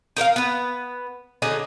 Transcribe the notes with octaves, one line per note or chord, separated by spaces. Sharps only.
D#4 A#4 E5 F5
B3 B4
D3 F#3 D#4 G#4